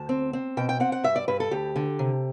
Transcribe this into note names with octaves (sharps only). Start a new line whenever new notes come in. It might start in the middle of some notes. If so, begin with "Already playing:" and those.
Already playing: D2 A5
C4
C4
B2 G5
G5
C4 F#5
F#5
G2 E5
D5
G2 B4
A4
D2 G4
D3
C3